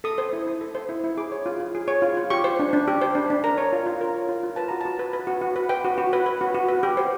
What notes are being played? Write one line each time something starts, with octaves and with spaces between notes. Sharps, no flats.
A4 D#6
C5
E4
E4
A4
C5
E4
E4
G#4 D6
C#5
F4
F4
G#4
C#5
F4
F4
G4 C#6
C5
D4
D4
G4
C5
D4
D4
A#4 A#5
C#5
F4
F4
A#4
C#5
F4
F4
B4 A5
F#4 A#5
F#4 A5
B4
B4
F#4
F#4
B4
B4 G5
F#4
F#4
B4
B4
F#4
F#4
B4
G4
C5